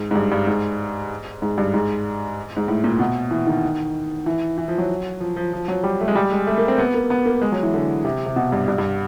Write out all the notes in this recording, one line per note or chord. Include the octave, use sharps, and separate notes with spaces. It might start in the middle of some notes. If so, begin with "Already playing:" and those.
Already playing: G#2
G#2
G2
G2
G#2
G#2
G2
G#2
G#2
A2
A#2
B2
E3
D#3
E3
E3
F3
F#3
F3
F3
F3
F#3
G3
A3
G#3
G3
G#3
A3
A#3
C4
B3
A#3
B3
A#3
G#3
F#3
E3
D3
C3
C3
B2
G2
G2
G2